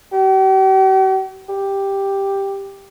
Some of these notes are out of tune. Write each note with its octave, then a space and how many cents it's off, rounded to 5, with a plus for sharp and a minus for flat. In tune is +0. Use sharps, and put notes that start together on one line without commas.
G4 -45
G4 +5